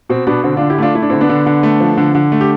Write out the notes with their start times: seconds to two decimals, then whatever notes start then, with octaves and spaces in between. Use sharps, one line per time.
0.09 B2 C4
0.27 B2 B3 D4
0.44 D3 C4
0.57 D4 F4
0.61 D3
0.70 E4 G4
0.78 A3 D4 F4
0.95 A3 E4
1.02 D4
1.10 D3 C4 E4
1.21 B3 D4
1.29 D3
1.46 D3
1.63 A3
1.80 F3
1.97 D3
2.15 D3
2.32 A3
2.41 G4